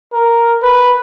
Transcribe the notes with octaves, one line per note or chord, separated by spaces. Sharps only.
A#4
B4